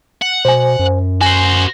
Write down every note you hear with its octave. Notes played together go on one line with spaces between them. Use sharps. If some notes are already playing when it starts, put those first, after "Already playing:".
F#5
B2 C5 G#5
F#2
F#4 C5 G#5